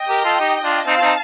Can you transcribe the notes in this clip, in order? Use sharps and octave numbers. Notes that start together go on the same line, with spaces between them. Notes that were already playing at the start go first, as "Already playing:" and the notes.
Already playing: D#5 G5
G4 A#4
F4 A4
D#4 G4
D4 F4
C4 D#4 F5 A5
F4
C4 D#4